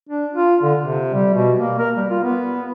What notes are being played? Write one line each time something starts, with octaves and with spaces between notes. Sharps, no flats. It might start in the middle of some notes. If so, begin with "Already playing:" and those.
D4
F4
D3
C3
G3
B2
A#3
A#4
G3
F4
B3